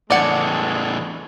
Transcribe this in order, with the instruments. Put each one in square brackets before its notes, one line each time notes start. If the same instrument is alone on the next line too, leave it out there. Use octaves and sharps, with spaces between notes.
[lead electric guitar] E2 A2 [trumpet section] G#3 D4 A4 [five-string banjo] D5 F#5